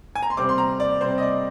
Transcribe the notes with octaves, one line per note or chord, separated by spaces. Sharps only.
G#5
A#5
C6
C3 G3 C4 D6
C6
A#5
D5
C3 G3 C4 C5
D#5
D5